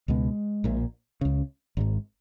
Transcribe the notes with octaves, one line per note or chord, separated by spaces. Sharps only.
C#2 B2 G#3
A#1 A#2
C#2 C#3
G#1 G#2